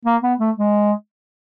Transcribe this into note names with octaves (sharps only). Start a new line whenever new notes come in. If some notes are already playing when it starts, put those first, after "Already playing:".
A#3
B3
A3
G#3